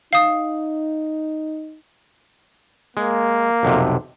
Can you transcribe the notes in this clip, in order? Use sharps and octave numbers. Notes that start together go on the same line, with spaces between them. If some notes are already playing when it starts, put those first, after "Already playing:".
D#4 F5 D#6
G#3 A#3
B1 F2 C3